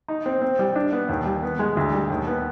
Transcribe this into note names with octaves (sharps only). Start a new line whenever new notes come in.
D#4
C4
C4
G3
D4
B3
D#2
G3
B3
G#3
D2
G3
D#2
B3